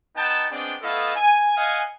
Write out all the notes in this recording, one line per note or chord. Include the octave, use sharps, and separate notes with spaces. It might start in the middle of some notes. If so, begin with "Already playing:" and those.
B3 D#4 F#5 G5 A5
G#3 B3 C4 D4 D5 G5
A3 B3 E4 A4 D#5 F5
G#5
D#5 F5 F#5 G#5